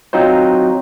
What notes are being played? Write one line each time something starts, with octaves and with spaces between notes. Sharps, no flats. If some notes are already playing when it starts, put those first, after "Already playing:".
F#3 C4 D#4 F4 C5